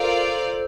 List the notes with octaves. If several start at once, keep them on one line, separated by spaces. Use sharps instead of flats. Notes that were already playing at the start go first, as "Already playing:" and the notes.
Already playing: F4 A4 A#4 C5 D5 F5